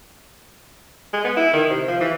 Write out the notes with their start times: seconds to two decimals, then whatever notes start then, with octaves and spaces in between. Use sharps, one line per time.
1.13 G#3
1.25 B3
1.37 E4
1.53 D#3
1.70 C3
1.88 F3
2.01 E3